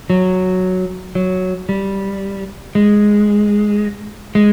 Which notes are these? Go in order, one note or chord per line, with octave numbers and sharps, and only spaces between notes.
F#3
F#3
G3
G#3
G#3